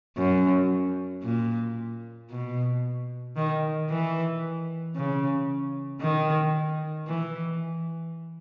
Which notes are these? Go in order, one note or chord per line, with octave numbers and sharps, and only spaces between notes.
F#2
A#2
B2
D#3
E3
C#3
D#3
E3